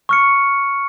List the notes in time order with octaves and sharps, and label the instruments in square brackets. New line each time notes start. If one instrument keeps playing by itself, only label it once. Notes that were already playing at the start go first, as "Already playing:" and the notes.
[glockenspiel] C#6 F6 C#7